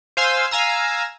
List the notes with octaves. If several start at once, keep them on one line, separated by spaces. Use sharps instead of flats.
C5 F5 G#5 C6 E6
F5 G#5 A#5 E6